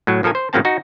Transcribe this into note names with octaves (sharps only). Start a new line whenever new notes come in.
A2 F#3
A#1 F3 A4 A#4 G#5
C5
A2 C#3 F#3 A#3 C4 A5
D#4 F#4